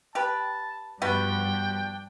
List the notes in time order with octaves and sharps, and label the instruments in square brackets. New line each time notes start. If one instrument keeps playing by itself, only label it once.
[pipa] G4 B4 [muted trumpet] A5
[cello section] G2 F3 [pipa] G3 B3 F#4 [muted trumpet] D4 [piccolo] G5